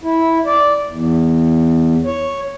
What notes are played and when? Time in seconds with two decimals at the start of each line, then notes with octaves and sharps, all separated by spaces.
0.03 E4
0.45 D5
0.89 E2
2.05 C#5